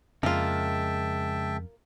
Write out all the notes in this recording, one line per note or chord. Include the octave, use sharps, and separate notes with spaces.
F2 C#3 G#3 A#3 F4 E5 G5 A5